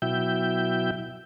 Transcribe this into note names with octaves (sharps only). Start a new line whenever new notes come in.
B2 F#3 E4 E5 G5 G6